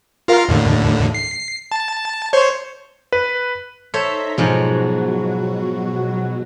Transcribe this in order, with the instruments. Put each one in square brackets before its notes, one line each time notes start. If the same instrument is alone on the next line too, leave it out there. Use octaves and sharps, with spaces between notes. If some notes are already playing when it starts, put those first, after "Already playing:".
[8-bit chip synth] F4 A#4 F5
D#2 A2 D3
C7
A5
C5 C#5
[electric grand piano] B4
[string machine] D#4 A#5 [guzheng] A4 C5 C#5 [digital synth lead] E5
[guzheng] G#2 F3 G#3 [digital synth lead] B2 [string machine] F#3 F#4